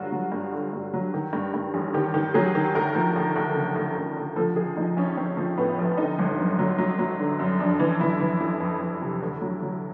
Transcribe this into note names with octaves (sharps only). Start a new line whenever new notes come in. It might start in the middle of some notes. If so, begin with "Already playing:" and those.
Already playing: G2 D3 F#3 F4 F#4
F#3
G2
D3
G2
F#3
D#3
G2
G2
A1
D#3 G4
D#3
F#3 G#4
D#3
D2 A#4
F3
D2
D2
C#3
D2
D2
D2
F3 A4
A#1 G#4
F3 D#4
A#1 C#4
A#1 C4
F3
A2 B3
A#1
D3 D#4
G1
F#2
F#3
F#3
F#3
D3
F#2
F2 D4
E3
E3 E4
E3
F2 E4
F2
F2
C3
D2
F#3
F#3